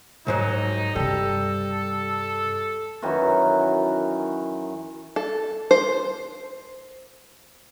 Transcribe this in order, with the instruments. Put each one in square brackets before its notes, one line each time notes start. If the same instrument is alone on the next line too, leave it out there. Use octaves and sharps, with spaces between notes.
[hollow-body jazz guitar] C2 G#2 F#3 [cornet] D#4
[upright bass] G2 C3 [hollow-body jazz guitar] G3 [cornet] A4
[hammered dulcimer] F#2 D#3 E3 F#4
[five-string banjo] A4
C5